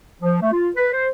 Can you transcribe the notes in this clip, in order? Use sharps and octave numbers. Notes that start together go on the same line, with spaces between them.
F3
A3
F4
B4
C5